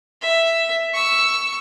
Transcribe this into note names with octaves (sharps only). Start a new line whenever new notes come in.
E5
C#6 E6